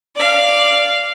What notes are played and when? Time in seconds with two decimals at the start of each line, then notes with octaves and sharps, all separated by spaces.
0.16 D5 F5